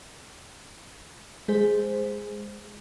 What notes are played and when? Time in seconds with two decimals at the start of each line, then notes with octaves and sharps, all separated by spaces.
1.48 G#3 G#4 C5